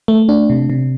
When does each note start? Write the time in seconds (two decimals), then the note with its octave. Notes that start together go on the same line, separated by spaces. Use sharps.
0.08 A3
0.29 D4
0.50 C3
0.70 C3